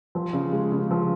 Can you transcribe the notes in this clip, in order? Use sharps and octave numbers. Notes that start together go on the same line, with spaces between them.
F3
C#3
G#3
C#3
F3